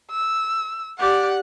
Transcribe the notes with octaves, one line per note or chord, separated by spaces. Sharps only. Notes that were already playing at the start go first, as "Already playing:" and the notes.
E6
G4 D5 F#5